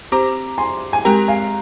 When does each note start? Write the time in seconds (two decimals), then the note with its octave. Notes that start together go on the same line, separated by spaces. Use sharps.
0.12 C4 G4 C5 A#5 D6
0.58 G#5 C6
0.93 G#5
1.05 G#3 C4 G4 A#4 G5 A#5
1.28 F5 G#5